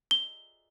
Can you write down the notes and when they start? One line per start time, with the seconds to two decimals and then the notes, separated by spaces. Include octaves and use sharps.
0.11 G7